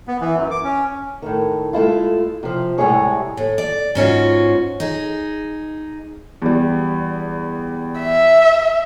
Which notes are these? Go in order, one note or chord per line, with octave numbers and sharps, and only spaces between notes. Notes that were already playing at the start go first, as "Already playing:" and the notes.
B3
E3
F#2
D6
C#4
A2 D#3
G#3 A3 E4 F4
C3 F3
A2 C3 G3 G#3 G#4 C#5
A2
D5
G#2 C#4 F4 F#4
D#4 G#4
E2 G3
E5